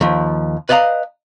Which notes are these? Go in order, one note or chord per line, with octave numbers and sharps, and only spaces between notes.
D#2 F3
B4 D5 D#5 F5 A#5